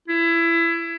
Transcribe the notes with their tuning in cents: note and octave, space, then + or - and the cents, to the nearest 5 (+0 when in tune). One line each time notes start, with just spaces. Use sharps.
E4 +25